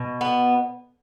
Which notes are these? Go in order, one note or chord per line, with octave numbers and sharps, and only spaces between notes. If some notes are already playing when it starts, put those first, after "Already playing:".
Already playing: B2
B3